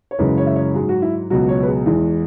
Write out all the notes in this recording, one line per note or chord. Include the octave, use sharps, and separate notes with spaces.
C#5
F#2 C#3 E3 G#3 B4
C#5
E5
C#5
G#2 F#3 G#4
F#4
E4
C#2 B2 F#3 F#4
C#5
B4
G#4
E2 E3 G#3